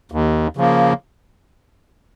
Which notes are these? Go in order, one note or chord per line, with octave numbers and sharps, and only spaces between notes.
D#2
C#3 F3 A#3